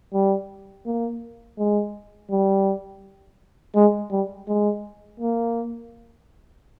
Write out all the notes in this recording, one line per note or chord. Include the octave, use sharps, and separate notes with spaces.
G3
A#3
G#3
G3
G#3
G3
G#3
A#3